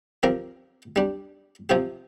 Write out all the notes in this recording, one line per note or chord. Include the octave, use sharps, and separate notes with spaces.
F3 C4 G4 A#4
G3 D4 G4
C3 F3 C4 G4